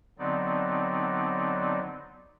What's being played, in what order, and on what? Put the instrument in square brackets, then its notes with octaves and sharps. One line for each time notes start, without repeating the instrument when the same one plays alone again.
[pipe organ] D3 F#3 B3 C4 D#4 D5